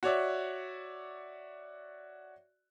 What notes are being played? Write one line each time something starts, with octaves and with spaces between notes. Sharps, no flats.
F#4 C#5 D5 E5